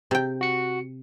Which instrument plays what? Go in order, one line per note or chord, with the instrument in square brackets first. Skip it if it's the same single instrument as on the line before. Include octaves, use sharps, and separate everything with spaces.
[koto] C3 G5
[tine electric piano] F#4 C#7